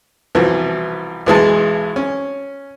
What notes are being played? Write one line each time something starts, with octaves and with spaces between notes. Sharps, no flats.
C2 B2 E3 F3
B1 E3 G#3 A5
C#4